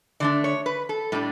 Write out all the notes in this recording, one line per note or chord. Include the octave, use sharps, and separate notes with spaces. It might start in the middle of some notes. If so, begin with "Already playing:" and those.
D3 A3 D4 D5
C#5
B4
A4
A2 G3 D4